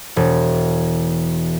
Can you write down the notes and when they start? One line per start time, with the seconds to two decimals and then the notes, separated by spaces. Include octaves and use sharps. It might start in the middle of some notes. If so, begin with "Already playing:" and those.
0.16 E1